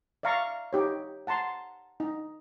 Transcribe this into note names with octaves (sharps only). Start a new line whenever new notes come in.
D5 E5 F5 A#5 C#6
D#4 G4 C#5
F#5 A5 A#5 C6
D#4